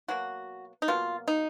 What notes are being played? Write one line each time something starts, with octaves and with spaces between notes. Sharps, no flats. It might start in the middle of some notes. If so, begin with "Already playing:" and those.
B2 F#3 A#3 F#4
D#4
B2 F#3 A#3 F4
D#4